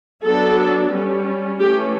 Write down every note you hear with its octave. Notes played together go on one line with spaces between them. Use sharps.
F#3 B3 D4 A4
G3 C#4
E3 A3 C#4 G4